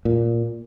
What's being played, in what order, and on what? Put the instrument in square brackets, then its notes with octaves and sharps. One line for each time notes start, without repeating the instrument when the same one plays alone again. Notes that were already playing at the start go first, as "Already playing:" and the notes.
[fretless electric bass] A#2